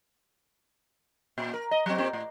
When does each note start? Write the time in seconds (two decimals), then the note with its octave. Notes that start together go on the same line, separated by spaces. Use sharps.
1.38 A#2
1.54 A#4
1.71 D#5
1.86 F#3 C4
1.98 A#2 C4 G4
2.13 A2